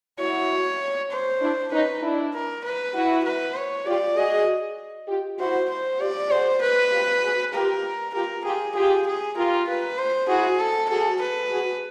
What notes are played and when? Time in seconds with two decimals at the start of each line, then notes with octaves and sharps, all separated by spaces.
0.19 E4 F#4 C#5
1.11 C5
1.41 D4 E4
1.72 C#4 D#4 B4
2.02 D4 E4
2.34 A#4
2.64 B4
2.94 E4 F#4
3.25 B4
3.55 C#5
3.86 F4 G4 D5
4.16 F#4 G#4 D#5
5.08 F4 G4
5.39 E4 F#4 C5
5.70 C5
6.00 F4 G4 D5
6.30 F#4 G#4 C5
6.61 B4
6.92 F4 G4
7.22 F#4 G#4
7.53 F4 G4 A#4
8.14 F4 G4 A#4
8.44 F4 G4 G#4
8.75 F4 G4 G#4
9.06 G#4
9.37 F4 G4 A#4
9.67 B4
9.98 C5
10.28 E4 F#4 G#4
10.59 A4
10.89 F#4 G#4 A4
11.21 B4
11.51 F#4 G#4